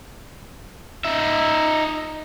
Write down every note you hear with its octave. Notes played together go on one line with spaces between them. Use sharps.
D#4 E5